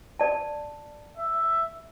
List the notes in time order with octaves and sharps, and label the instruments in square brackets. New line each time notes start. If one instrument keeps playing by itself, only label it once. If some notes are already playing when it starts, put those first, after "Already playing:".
[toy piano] D5 A5
[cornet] E5